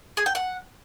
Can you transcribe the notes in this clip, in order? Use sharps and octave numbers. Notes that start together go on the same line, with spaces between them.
G#4
G5
F#5